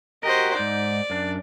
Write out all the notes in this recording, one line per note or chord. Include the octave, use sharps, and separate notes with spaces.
F#4 G4 A#4 C5 D#5
G#2 D#4 D5
F#2 D4